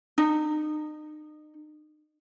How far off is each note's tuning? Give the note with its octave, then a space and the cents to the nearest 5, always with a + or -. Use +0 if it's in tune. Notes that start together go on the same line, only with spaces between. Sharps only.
D#4 -40